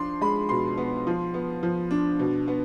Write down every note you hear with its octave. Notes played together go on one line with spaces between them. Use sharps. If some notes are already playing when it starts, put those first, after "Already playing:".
Already playing: F3 D4 C6
G#3 B5
B2 C6
B3
F3
B3
F3
D4
B2
B3